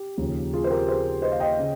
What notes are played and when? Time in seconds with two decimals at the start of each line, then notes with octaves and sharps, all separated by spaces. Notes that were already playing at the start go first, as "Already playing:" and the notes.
Already playing: G4
0.18 D#2 C#3 F3
0.53 F4 G#4
0.64 C5
0.70 G4 A#4
0.88 G#4 C5
1.22 C5 D#5
1.32 F5
1.40 D#5 G5
1.59 C#3